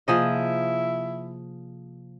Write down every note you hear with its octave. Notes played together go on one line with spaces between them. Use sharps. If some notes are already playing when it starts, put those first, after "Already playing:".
C3 F3 A#3 E4 G#4 D#5